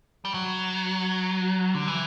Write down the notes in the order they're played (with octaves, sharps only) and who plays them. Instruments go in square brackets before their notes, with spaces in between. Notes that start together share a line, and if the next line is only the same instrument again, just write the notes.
[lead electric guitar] G3
F#3
D3
E3